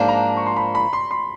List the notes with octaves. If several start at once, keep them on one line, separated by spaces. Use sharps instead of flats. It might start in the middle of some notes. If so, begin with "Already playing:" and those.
Already playing: G#2 F3 A#3 D4
A#5
C#6
C6
B5
B5
C6
C6